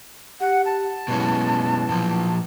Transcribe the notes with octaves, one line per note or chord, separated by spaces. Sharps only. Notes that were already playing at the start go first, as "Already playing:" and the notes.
G4 F#5
A5
B2 F#3 G#3 C#4 E4 B4
A#2 F3